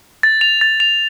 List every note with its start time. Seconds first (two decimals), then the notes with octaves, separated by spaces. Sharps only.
0.23 A6
0.41 F7
0.61 A6
0.80 F7